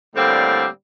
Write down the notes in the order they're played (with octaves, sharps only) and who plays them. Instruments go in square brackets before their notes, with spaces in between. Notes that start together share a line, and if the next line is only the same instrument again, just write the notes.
[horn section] A2 D3 G3 A#3 C4